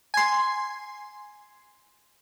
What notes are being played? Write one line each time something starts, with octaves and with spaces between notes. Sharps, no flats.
G#5 C6